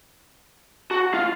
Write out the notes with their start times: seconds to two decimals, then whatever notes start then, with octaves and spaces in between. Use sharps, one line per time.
0.91 F#4
1.14 F4